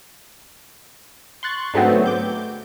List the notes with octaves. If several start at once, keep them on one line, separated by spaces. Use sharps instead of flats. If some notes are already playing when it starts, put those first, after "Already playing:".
C6 C#6 F#6 A6
G#2 D3 F#3 A3 B3 C4
D6 G6